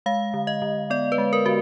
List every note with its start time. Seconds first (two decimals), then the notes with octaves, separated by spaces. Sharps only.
0.06 G#3 F5
0.34 D3
0.47 D#5
0.62 D3
0.90 B3 D5
1.12 B4
1.18 G#3
1.33 A#4
1.46 D3 F#4